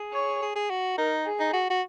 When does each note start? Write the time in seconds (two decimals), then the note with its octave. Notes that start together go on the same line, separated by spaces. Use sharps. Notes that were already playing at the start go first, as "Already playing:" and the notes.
Already playing: G#4
0.13 C#5
0.42 G#4
0.56 G#4
0.70 F#4
0.97 D#4 A#4
1.26 G#4
1.40 D#4
1.53 F#4
1.70 F#4